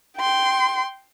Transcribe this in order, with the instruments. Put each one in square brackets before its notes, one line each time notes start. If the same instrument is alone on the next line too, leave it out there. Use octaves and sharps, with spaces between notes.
[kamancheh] G5 C6